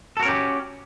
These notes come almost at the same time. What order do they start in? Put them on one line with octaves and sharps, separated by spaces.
A4 F#4 A#4 C#4 G4